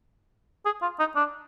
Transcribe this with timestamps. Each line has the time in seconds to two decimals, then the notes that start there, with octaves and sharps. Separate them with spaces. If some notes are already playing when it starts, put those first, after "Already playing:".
0.65 G#4
0.82 F4
0.99 D#4
1.16 D4